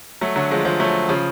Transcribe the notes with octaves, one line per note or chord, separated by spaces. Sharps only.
F#3 A3
D3 F#3
F3 G#3
F3 G#3
F#3 A3
C#3 F3